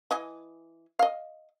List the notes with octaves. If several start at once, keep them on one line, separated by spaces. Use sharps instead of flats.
E3 D#5 G#5
D#5 F5